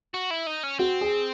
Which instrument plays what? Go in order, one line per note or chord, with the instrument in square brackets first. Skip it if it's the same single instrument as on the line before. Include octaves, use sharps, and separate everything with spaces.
[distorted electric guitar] F#4
E4
D#4
C#4
[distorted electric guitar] C4 [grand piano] F#4
[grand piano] G#4